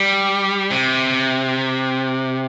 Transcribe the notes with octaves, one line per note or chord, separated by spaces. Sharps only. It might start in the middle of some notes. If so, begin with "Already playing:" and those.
Already playing: G3
C3